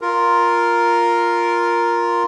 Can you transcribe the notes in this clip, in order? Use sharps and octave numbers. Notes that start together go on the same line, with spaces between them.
F4 A#4